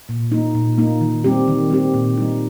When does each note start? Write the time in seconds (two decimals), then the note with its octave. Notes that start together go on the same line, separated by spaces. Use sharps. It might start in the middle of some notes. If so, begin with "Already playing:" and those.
0.09 A#2
0.32 A#3 D#4
0.55 A#2
0.78 A#3 D#4
1.01 D#3
1.24 G3 C4 G4
1.48 D#3
1.70 G3 C4 G4
1.94 A#2
2.17 G3 D#4